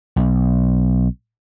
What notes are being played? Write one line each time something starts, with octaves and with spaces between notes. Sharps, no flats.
B1